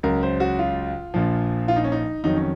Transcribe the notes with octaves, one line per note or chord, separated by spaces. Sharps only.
C#2 C#3 F#3 A#4
C5
F#4
F4
A#1 A#2 F3
F4
D#4
C#4
D#4
F2 D#3 F#3 D#4
C#4